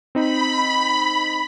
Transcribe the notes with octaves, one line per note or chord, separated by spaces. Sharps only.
C4 D#4 B5